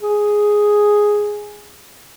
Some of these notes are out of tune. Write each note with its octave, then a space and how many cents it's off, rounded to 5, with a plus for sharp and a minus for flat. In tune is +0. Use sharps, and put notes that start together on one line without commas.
G#4 +0